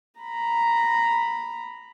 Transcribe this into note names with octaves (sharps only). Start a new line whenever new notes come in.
A#5 B5